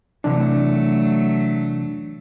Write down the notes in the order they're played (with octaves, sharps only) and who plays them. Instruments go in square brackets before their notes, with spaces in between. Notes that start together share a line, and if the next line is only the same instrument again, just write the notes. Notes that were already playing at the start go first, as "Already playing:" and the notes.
[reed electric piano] C3 E3 D4 [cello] F#3 A3